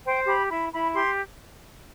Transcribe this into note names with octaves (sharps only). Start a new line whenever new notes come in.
C5 G5
G4 B5
E4 B5
E4 B5
G4 C6